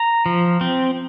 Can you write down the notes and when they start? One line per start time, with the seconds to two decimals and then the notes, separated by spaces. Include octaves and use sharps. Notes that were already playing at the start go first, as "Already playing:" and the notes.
Already playing: A#5
0.26 F3
0.61 C4